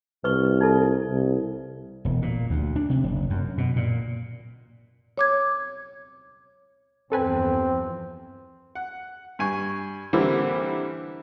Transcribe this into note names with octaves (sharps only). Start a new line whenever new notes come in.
C2 B4 C#6
D#4 E4 A4
C2
E1
A#2
D2
D4
C3
F#1
F#2
B2
A#2
C#5 D6 G#6
E2 G2 F3 C4 A4 B4 G#5
F#5
G2 G#5 C#6
D3 E3 G3 A#3 C4